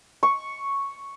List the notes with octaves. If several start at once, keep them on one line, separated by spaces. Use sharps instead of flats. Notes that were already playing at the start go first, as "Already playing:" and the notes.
C#6